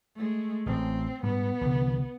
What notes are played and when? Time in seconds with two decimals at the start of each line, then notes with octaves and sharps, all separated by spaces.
0.15 G#3 A3
0.66 A1 C4
1.23 G#2 G3 B3
1.61 C2 D3 E3